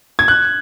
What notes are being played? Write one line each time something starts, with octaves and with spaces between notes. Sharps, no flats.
G#6
F#6